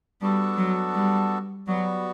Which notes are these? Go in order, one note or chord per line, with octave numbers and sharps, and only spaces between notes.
G3 B3 D4 F#4 A4
F#3
G3
F#3 G3 B3 F#4